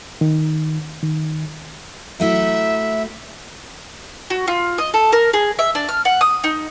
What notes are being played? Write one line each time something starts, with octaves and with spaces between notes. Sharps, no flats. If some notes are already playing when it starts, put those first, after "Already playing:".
D#3
D#3
F#3 A3 E4 E5
F#4
F4
D#5
A4
A#4
G#4
E5
D4
F6
F#5
D#6
D#4